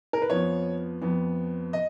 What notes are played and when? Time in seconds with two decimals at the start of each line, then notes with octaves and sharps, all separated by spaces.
0.13 A#4
0.22 B4
0.30 F2 F3 B3 C#5
1.02 F2 F3 B3
1.73 D#5